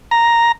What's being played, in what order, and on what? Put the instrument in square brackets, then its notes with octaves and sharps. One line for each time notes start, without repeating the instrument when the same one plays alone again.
[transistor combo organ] A#5